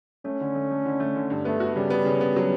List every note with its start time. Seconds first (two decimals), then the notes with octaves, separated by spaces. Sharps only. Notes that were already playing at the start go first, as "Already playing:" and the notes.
0.25 A3 C#4
0.41 D3
0.55 A3
0.71 A3
0.85 D3
1.00 A3
1.16 D3
1.30 G2
1.45 A3 B3
1.60 F#4
1.76 C#3 G3
1.90 B3
2.05 C#3
2.21 B3
2.36 F#3